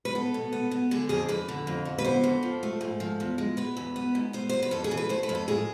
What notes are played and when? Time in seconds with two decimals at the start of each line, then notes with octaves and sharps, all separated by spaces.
0.05 B4
0.15 B3 A4
0.34 B2
0.53 B3
0.71 B3
0.91 D3 G#4
1.09 F2 G#4
1.29 F2 B4
1.49 D3
1.67 F2
1.85 D3
1.98 B4
2.04 B3 C5
2.24 F2
2.43 F3
2.63 A3
2.81 G#2
3.00 F3
3.20 E2
3.38 G#3
3.57 B3 B4
3.77 E2
3.96 B3
4.15 G#2
4.33 B3 C5
4.49 B3 C5
4.62 B4
4.71 F2 A4
4.84 G#4
4.91 E3
4.97 B4
5.09 A3 C5
5.23 B4
5.29 F2
5.35 A4
5.48 A2 G#4